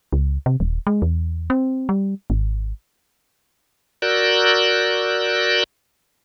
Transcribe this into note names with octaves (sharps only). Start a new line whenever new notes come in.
C#2
C3
D#1
G#3
E2
C4
G3
G#1
F#4 A#4 D5 E6 F#6 G6